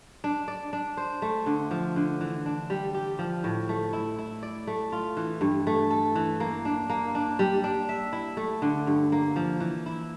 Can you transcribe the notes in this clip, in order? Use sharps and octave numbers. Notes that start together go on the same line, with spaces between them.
D4
D5
D4
C5
A3
D3
F3
D3
E3
D4
G3
G4
F3
A2
A3
E4
E4
D5
A3
F4
E3
G2
A3
A4
E3
A#3
D4
A#3
D4
G3
D4
E5
E4
A3
D3
G2
A#3
F3
E3
E4